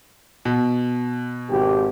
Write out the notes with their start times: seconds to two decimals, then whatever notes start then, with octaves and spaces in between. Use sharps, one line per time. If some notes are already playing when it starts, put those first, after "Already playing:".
0.45 B2
1.50 G#1 G4